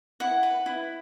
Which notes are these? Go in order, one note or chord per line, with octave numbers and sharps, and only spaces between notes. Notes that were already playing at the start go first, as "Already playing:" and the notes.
E4 F#5
B4
E4